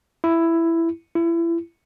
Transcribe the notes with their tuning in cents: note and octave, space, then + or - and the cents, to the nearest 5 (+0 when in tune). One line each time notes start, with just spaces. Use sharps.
E4 +10
E4 +30